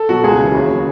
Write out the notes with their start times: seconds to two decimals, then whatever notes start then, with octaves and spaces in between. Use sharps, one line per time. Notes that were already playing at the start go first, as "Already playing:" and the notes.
Already playing: A4
0.09 B2 F#3 F#4
0.24 C#2 G#4
0.39 C#3 E3
0.55 D#2
0.70 C#3 F#3